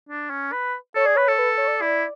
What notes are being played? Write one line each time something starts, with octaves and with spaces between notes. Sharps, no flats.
D4
C#4
B4
A4 C#5
G#4 D5
B4 C#5
A4
B4
C#5
D5
E4